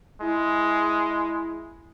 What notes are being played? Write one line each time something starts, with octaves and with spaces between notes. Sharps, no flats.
G#3 E4